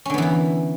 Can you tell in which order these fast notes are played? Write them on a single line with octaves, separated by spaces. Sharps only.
C#4 D3 B3 E3 E4